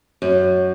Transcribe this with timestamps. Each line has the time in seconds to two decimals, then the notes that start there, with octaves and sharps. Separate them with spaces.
0.22 F#2